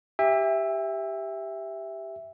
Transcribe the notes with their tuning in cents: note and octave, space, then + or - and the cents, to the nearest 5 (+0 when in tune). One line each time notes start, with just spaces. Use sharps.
G4 +0 E5 +0 G5 +45